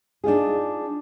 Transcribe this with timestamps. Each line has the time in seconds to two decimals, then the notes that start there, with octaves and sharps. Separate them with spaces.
0.24 D4 D#4 F4 G#4